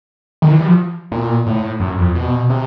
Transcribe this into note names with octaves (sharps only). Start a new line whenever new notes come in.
D#3
E3
G3
F3
A#2
A2
F#2
F2
B2
C3